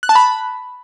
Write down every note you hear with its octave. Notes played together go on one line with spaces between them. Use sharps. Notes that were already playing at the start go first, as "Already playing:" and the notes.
F#6
A5
B5